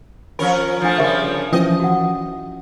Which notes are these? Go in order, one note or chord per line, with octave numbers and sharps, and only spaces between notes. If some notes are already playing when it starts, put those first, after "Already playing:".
F3 C#4 A#4 B5
F3 A3 D4 F4
C#3 F3 G3 G4 A#4 E5
E3 F3 C#4 D#5
F#4 F#5